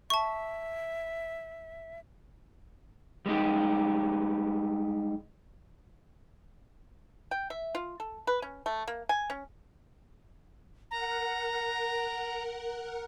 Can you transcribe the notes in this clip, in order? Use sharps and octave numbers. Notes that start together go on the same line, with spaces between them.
E5 A5 C#6
G3 G#3 D#4 G4
G5
E5
F4
A4
B4
C#4
A3
A#3
G#5
C#4
A#4 F#5 A#5